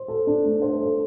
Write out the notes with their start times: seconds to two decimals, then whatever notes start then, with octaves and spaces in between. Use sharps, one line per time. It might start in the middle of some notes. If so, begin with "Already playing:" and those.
Already playing: C5
0.08 A4
0.27 D4
0.45 A3
0.62 C5
0.80 A4